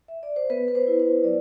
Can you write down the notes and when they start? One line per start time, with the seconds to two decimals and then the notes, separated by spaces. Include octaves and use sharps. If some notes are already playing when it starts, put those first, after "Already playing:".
0.08 E5
0.23 D5
0.36 C5
0.50 B3 B4
0.68 B4
0.75 C5
0.87 E4
1.00 C5
1.24 F#3 D5